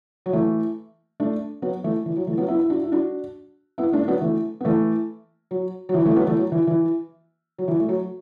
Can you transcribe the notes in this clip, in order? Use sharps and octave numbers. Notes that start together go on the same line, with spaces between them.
F#3
E3 A3
A3 D4
F#3 B3
E3 A3
E3
F#3
E3 A3
F#3 B3
B3 E4
E4
D4 F#4
E4
D4 F#4
B3 E4
A3 D4
D4
F#3 B3
E3 A3
B3
E3 A3
F#3
F#3
E3
E3 A3
F#3 B3
E3 A3
F#3
E3
E3
F#3
E3
A3
F#3